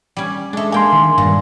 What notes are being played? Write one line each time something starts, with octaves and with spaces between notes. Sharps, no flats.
G3 C#4
G#3 A3 D4
A#3 G5 G#5 C6
D#3
G2 A#2